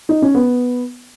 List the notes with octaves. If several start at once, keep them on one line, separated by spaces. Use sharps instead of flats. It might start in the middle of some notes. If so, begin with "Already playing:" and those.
D#4
C#4
B3